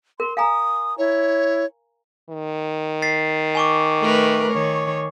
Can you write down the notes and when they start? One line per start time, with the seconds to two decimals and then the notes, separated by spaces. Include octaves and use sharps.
0.20 A#4 C6
0.37 F5 G#5 A#5 D#6
0.98 E4 C#5
2.29 D#3
3.02 A6 B6 C7
3.55 G#5 C#6 D6
4.02 A3 A#4 B4
4.53 D#3 C#5